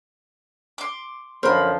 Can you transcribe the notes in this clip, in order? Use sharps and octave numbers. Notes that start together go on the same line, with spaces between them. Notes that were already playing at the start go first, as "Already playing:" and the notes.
C6 D6
F#2 D3 F3 A#4 C5 B5